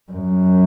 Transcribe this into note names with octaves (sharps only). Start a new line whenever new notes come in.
F#2